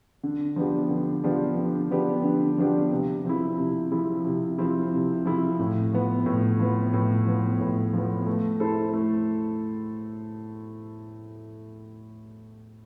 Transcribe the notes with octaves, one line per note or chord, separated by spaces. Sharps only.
D3
F3 B3 D4 G4
D3
F3 B3 D4 G4
D3
F3 B3 D4 G4
D3
F3 B3 D4 G4
C3
F3 C4 E4
C3
F3 C4 E4
C3
F3 C4 E4
C3
F3 C4 E4
A2
F3 B3
A2
F3 B3
A2
F3 B3
A2
F3 B3
A3
E4 A4 C5
A3